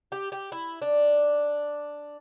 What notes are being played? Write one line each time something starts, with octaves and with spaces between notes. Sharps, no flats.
G4
G4
E4
D4